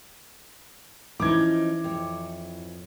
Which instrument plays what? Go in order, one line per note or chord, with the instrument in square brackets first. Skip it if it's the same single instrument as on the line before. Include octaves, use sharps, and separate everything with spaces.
[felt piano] E3 [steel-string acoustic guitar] F3 C#4 D#4 [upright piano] D6 G#6
[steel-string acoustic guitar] F2 C#5